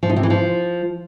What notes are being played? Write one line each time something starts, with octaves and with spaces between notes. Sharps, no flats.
F3
D#4
C3
E3
F3